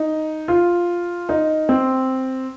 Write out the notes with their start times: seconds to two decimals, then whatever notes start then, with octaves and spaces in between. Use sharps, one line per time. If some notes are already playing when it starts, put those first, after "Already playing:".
Already playing: D#4
0.48 F4
1.29 D#4
1.69 C4